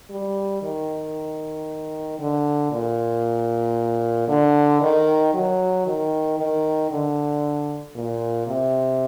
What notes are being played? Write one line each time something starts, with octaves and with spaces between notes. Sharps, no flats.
G3
D#3
D3
A#2
D3
D#3
F#3
D#3
D#3
D3
A#2
C3